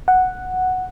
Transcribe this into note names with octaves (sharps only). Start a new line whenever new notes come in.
F#5